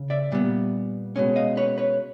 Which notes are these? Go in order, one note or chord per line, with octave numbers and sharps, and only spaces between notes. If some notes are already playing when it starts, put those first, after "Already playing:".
Already playing: C#3
D5 E5
A#2 G3 B3
B2 G#3 C#4
D#5 F5
B4 C#5
B4 C#5